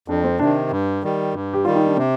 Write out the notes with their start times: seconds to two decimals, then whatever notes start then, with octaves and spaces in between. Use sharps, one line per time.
0.08 F2 D4
0.24 C4
0.39 C3 D#3 D4
0.71 G2
1.03 D#3 G3
1.34 G2
1.53 G4
1.65 D#3 G3 F4
1.76 D#4
1.86 D4
1.97 C3 C4